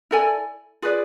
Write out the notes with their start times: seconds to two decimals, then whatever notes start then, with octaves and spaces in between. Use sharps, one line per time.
0.11 E4 A4 D5 G#5
0.82 F4 G#4 B4 D5